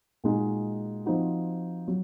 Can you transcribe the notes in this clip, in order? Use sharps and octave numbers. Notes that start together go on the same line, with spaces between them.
A#2 G#3 D#4 F#4
F3 C4 D#4 F#4
F#3